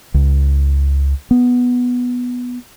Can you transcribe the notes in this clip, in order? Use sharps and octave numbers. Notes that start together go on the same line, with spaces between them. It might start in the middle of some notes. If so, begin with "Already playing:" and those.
C#2
B3